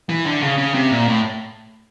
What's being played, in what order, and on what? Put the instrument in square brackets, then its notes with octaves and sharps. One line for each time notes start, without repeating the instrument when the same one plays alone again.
[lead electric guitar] E3
D3
C#3
C#3
C3
A#2
A2